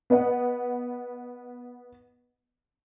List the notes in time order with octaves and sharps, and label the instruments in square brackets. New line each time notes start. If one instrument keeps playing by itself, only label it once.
[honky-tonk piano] B3 B4 D#5 F#5